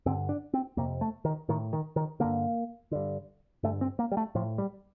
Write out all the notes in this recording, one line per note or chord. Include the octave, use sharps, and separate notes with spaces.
G2 D3 C4
D4
C4
F2 C3 A#3
A3
D#3
A2 D#3
D#3
D#3
G2 D3 A#3
G2 D3
G2 D3 A3
C4
A#3
G3
A3
A2 F3
G3